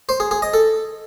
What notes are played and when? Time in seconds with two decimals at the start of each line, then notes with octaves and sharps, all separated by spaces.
0.09 C5
0.20 G#4
0.31 G#4
0.42 D#5
0.54 A4